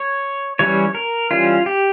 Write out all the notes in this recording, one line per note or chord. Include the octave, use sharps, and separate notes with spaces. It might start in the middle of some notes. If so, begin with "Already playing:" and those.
Already playing: C#5
E3 G3 C#4 C#5
A#4
E3 G3 C#4 F4
G4